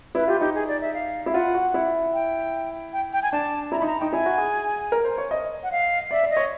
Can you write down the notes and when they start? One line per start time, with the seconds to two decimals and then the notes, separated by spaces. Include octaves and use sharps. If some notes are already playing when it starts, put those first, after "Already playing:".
0.15 E4 B4
0.28 F4 G4
0.41 D#4 G4
0.55 G#4
0.68 D5
0.82 E5
0.94 F5
1.26 E4
1.33 F4 F#5
1.54 F#4
1.74 E4
2.14 G5
2.93 G5
3.13 G5
3.23 G#5
3.32 D4 A5
3.72 E4 A#5
3.79 B5
3.82 D#4
3.87 A#5
4.00 D#4 G5
4.12 E4 G#5
4.26 F#4
4.38 G#4
4.92 A#4
5.04 C5
5.18 C#5
5.31 D#5
5.63 F#5
5.72 F5
6.11 D5 E5
6.23 D5
6.31 D#5
6.37 C#5